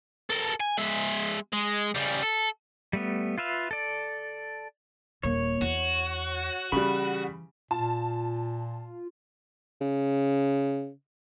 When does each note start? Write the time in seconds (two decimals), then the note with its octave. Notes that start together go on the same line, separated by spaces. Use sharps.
0.30 A4 A#4
0.60 G#5
0.78 G#3 E5
1.53 G#3
1.95 C#3 G3
2.23 A4
2.93 G3 A3 B3
3.38 F4 B4 E5 F5
3.71 A4 D5
5.23 D#1 A#3 C#5
5.62 E2 F#4
6.72 C#3 E3 G3 B5
7.71 A#2 F4 A5
9.81 C#3